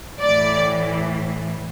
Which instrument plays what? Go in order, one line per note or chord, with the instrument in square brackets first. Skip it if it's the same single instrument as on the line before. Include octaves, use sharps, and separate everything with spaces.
[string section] A2 E3 D5